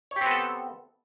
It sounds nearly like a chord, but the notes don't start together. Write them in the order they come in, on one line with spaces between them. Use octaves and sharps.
C#5 G4 C4 B3 A4